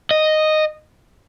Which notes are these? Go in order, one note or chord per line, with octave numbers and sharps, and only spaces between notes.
D#5